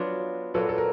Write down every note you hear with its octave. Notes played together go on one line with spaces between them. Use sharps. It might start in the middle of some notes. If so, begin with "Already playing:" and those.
Already playing: F#3 B3 D4 F4
A#2 F#3 A#3 C#4 A4 B4
A4
A#4